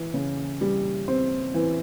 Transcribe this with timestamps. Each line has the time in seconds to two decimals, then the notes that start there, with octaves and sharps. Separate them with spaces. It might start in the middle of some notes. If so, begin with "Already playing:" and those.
Already playing: E3
0.14 C#3
0.61 G3
1.08 C4
1.54 E3